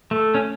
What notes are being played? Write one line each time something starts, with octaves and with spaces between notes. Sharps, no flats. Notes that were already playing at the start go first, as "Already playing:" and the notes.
A3
C#4